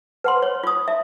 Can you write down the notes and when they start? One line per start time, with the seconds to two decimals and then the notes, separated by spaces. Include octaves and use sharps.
0.24 B4 F#5 C6
0.42 C#5
0.63 F4 D#6
0.88 E5